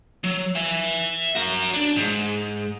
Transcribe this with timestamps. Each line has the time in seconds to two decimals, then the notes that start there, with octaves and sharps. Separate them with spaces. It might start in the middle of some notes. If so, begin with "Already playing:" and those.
0.24 F#3
0.55 E5 G#5
1.35 F#4 A#4
1.74 D4
1.96 G#2